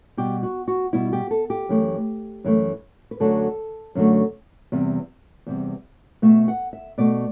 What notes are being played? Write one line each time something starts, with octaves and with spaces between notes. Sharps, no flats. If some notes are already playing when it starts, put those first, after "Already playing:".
B2 G3 G4
F#4
F#4
B2 G3 E4
G4
A4
G4
F#2 E3 A3
F#2 E3 A3
B4
F#2 D3 F#3 A3 A4
F#2 D3 F#3 A3
E2 C3 G3
E2 C3 G3
B2 A3 E5
F#5
E5
B2 A3 D5